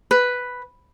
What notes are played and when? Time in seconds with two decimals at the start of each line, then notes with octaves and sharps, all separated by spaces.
0.11 B4